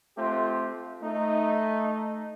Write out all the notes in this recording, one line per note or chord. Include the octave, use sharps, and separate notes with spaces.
A3 C4 F4 G4
A3 D#4